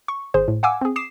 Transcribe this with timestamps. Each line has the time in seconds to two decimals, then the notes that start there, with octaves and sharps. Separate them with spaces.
0.08 C#6
0.34 G#1 G#4 C5
0.48 A2
0.63 F5 F#5 G#5 D6 E6
0.81 C4 G#4
0.96 D6 D#6 C7 E7